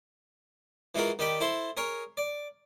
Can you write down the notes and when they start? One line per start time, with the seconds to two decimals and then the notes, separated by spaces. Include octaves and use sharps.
0.95 E3 G#3 F4 F#4 A#4
1.19 D#3 G4 D5 B5
1.40 E4 A4 C5 C6
1.77 G#4 A#4 C#5
2.17 D5